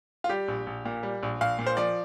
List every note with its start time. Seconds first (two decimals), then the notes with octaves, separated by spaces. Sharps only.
0.24 F4
0.29 G3 G4
0.48 A#1
0.67 A#1
0.85 A#2
1.03 G3
1.23 A#1
1.41 A#1 F5
1.59 A#2
1.67 C5
1.77 F3 D5